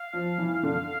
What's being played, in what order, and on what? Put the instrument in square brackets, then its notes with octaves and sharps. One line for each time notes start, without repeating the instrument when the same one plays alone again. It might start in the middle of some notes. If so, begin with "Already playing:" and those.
Already playing: [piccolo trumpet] F5
[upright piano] F3
E3
D3